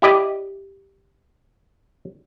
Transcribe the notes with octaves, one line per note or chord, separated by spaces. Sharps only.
E4 G4 D5 D#5